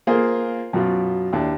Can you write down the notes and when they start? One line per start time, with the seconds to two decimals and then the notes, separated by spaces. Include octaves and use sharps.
0.07 A#3 F4 G#4 C5
0.73 F#2 B2 F4
1.33 D#2 D4 E4